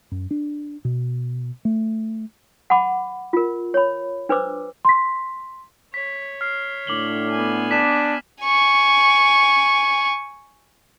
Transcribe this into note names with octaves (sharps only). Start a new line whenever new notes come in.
F#2
D4
B2
A3
F#5 A5 B5 D6
F4 A#4
C#5 B5
D4 B4 C5 D6 E6
C6 B6
C#5 B6
F6 C7
A2 D3 D6 F#7 G7
B3 G#5
D4 B6 E7
G#5 C#6